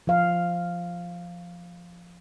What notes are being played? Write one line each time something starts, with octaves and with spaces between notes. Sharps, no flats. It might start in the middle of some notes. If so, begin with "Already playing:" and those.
F3 F5